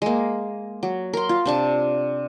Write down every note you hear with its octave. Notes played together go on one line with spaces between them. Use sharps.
G#3 A#3
F#3
A#4 C6
F4
C3 D4 A5